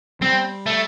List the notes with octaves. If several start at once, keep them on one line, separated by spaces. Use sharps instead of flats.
G3 C4
A3